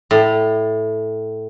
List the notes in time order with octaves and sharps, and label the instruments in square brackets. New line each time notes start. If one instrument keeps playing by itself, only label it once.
[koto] A2